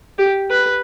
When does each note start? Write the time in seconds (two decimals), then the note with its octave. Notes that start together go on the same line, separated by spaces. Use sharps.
0.19 G4
0.51 B4